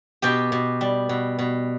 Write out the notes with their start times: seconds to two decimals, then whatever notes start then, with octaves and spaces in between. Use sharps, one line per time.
0.22 B2 G4 G5
0.52 B2
0.81 G3
1.09 B2
1.39 B2